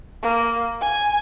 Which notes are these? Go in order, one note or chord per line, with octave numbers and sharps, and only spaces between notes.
A#3
G#5